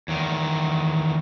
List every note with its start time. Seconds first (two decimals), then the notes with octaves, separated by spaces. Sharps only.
0.08 E2 D#3